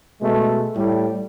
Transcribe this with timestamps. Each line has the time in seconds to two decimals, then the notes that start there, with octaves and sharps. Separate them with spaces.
0.22 B2 G#3 A3
0.76 A2 G3